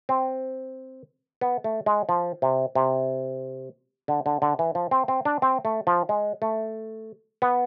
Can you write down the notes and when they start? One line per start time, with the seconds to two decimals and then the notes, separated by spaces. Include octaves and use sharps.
0.09 C4
1.41 B3
1.64 A3
1.86 G#3
2.09 F3
2.42 C3
2.75 C3
4.08 D3
4.26 D3
4.42 D3
4.59 E3
4.75 F3
4.91 C4
5.08 C4
5.25 D4
5.42 C4
5.65 A3
5.87 F3
6.09 G#3
6.42 A3
7.42 B3